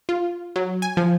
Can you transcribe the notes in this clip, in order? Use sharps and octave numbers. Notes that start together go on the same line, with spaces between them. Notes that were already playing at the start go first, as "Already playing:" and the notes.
F4
F#3
G#5
F3